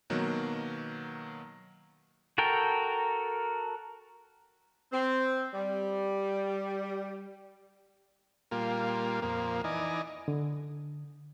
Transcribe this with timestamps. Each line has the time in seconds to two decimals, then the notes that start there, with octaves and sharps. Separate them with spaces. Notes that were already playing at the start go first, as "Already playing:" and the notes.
0.10 B2 D#3 F#3 A#3 B3 F#4
2.38 F#4 A4 A#4 G5
4.92 C4
5.53 G3
8.51 A#2 G3 A#3 F4
9.22 F2 A#2 A#3
9.64 E3 D#4 D5 D#5 G#5
10.28 D3